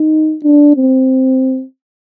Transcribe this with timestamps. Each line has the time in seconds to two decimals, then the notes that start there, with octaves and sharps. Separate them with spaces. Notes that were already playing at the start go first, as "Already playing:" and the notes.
Already playing: D#4
0.44 D4
0.76 C4